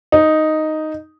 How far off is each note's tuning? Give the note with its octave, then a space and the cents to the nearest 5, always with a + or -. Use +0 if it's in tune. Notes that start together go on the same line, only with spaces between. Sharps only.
D#4 +0